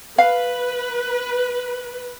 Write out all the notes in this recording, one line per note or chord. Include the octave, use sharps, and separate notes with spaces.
B4 F5